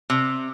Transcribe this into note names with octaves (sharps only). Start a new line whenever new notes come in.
C3